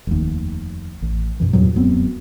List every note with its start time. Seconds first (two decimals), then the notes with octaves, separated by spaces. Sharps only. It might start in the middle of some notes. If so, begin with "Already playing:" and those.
0.07 F1 D#2
1.02 A1
1.40 F#2 B2 E3
1.53 E2 G2 A#2 F#3
1.75 D1 F#2 B3 C4